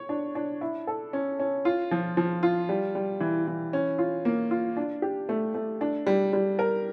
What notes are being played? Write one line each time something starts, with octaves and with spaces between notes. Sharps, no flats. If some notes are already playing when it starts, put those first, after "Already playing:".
Already playing: C#5
D4
D4
E4
A4
C#4
C#4
F4
F3
F3
F4
G3
G3
E3
E3
C#4
F4
A#3
F4
D4
G4
A3
A3
D4
G3
G3
A#4